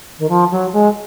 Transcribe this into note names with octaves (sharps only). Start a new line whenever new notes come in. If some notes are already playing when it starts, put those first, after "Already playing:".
D#3
F3
F#3
G#3